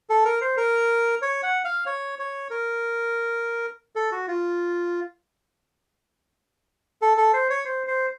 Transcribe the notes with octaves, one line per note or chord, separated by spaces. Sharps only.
A4
A#4
C5
A#4
C#5
F#5
F5
C#5
C#5
A#4
A4
F#4
F4
A4
A4
C5
C#5
C5
C5